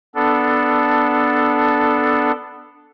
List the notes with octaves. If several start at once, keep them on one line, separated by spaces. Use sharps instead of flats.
B3 D4 A4